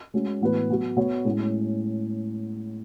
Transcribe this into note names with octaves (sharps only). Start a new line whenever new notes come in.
G#3 C#4 F#4
A2 E3 B3 F#4 B4
F#3 B3 F#4
B3 F#4 C#5
A2 G#3 C#4